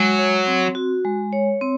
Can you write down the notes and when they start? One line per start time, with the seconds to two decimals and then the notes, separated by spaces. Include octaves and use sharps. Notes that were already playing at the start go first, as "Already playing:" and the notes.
Already playing: F#3 G#3
0.19 C#5
0.47 C4
0.75 F#4
1.05 G#3
1.33 C#5
1.61 C4